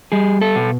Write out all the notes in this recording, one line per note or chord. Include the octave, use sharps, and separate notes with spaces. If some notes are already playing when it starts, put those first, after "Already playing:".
G3 G#4
A4
B2